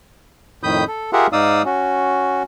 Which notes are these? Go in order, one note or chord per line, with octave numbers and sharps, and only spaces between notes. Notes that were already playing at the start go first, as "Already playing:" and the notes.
F2 A2 D#3 B5 D#6 G6
A4
F4 G4 G#4 A#4 E5 F#5
G#2 D#4 D5 F5 D#6 E6
C#4 F#4